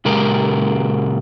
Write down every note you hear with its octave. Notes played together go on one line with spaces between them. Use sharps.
A#2 C#3 G#3 G4 A#4